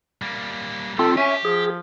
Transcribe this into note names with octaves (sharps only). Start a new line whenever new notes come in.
G3 A#3
D#3 G3 C4 F4 A4
C#4 G4 E5 G#5
F3 G#4